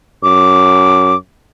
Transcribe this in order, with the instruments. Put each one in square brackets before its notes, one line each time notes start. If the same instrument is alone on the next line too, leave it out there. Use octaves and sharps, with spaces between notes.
[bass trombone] F#2 [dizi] D6